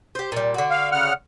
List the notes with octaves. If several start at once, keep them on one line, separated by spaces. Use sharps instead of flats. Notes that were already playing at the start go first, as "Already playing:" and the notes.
G4 C5
A#2 G3
D3 F#4
F5
C#3 F#5 F6